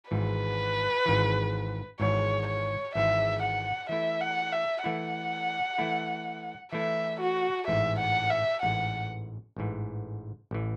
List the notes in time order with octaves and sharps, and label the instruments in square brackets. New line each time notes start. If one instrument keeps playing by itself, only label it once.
[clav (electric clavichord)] G#1 G#2 E3 [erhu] B4
[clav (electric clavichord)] G#1 G#2 E3
[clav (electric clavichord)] G#1 G#2 E3 [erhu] C#5
[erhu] C#5
[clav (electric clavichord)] G#1 G#2 E3 [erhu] E5
[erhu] F#5
[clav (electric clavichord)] E3 A3 E4 [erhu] E5
[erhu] F#5
E5
[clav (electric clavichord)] E3 A3 E4 [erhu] F#5
[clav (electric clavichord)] E3 A3 E4
[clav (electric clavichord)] E3 A3 E4 [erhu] E5
[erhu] F#4
[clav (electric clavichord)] A1 G#2 E3 [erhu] E5
[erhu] F#5
E5
[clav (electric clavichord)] A1 G#2 E3 [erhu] F#5
[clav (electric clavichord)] A1 G#2 E3
A1 E3